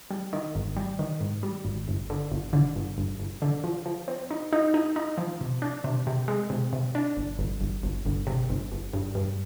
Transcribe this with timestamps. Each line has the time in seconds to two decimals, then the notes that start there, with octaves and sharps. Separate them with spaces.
0.11 G3
0.33 D#3
0.55 G#1
0.77 G3
0.99 D#3
1.20 G#2
1.43 G3
1.65 G#1
1.88 G1
2.10 D3
2.31 G1
2.53 D3
2.76 G1
2.98 G1
3.20 G1
3.42 D3
3.64 F3
3.86 F3
4.08 C4
4.31 D#4
4.53 D#4
4.74 D#4
4.96 D#4
5.18 F3
5.41 C3
5.62 D4
5.84 C3
6.07 C3
6.28 G#3
6.50 C3
6.73 C3
6.95 D4
7.17 G1
7.39 G1
7.61 G1
7.83 G1
8.06 G1
8.27 C3
8.50 G1
8.72 G1
8.93 G2
9.15 G2